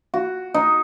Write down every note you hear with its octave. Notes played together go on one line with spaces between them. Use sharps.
F#4
D#4